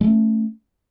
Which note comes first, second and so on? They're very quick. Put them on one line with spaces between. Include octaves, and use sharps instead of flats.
G#3 A3 C#4